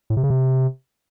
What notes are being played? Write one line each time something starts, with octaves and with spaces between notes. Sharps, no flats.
A2
C3
C#3
C3